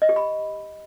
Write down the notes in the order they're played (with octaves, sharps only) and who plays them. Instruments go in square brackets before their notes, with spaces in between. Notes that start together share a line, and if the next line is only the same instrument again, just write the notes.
[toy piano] D#5
G4
B5